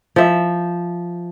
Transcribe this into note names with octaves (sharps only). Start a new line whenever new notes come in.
F3 E5